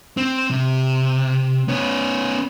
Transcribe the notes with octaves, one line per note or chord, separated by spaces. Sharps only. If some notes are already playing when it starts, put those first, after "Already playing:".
C4
C3
B3 C#4